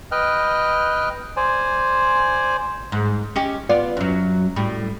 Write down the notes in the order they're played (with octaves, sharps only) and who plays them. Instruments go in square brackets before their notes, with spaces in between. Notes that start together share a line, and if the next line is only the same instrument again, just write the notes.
[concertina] B4 D#5 G5 F6 F#6
C5 D5 G#5
[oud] G#2
C#4 D#4 G4
B3 F4 D5
F#2 F#3
A2 G3